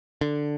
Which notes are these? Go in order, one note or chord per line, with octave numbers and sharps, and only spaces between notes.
D3